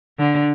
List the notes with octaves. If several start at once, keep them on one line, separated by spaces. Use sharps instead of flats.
D3